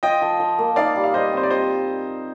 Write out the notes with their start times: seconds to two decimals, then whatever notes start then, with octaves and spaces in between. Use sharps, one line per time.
0.03 F4 D#5 G5
0.22 F3
0.40 F3
0.59 A#3
0.76 D#4 D5 F5
0.96 G3
1.04 F5
1.14 G3 C5 D#5
1.32 C4
1.37 C5
1.43 D5
1.51 F4 C5 D#5